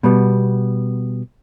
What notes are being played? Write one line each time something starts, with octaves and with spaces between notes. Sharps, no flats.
B2 G3 B3